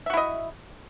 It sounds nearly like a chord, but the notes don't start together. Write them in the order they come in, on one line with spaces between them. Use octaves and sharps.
E5 F#4 E4 D#5